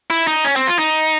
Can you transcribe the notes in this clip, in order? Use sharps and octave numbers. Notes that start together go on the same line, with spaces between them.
E4
D#4
C#4
C4
F4
D#4